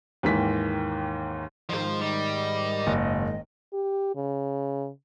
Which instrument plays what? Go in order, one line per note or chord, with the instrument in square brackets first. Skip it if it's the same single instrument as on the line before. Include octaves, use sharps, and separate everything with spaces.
[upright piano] D#2 G#2 D#3 E3 B6
[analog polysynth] G#2 D#3 [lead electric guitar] F3 C5
[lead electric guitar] G3 [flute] D#5
[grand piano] F#1
[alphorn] G4
C#3